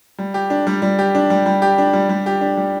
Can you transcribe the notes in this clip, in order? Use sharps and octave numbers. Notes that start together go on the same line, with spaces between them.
G3
G4
D4
G3
G3
G4
D4
G3
G3
G4
D4
G3
G3
G4
D4
G3